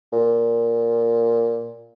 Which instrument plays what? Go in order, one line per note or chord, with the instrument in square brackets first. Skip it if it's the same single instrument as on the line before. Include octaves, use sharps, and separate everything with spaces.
[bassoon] A#2